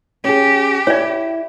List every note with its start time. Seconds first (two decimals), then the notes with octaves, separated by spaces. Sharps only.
0.24 C#4 G4 G#4
0.87 E4 C#5 D5